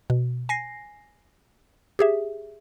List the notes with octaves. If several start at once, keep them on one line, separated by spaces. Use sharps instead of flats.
B2
G#5 A#6 C7
G4 G#4 E5